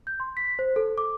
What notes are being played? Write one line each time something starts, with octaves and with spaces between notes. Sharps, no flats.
G6
C6
B6
C5
A4
D6